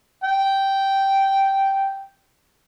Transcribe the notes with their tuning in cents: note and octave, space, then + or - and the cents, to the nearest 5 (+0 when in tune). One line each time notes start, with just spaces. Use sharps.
G5 -10